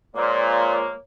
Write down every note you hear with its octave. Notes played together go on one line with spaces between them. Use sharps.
A#2 F3 G#3 A#3 C#5 D5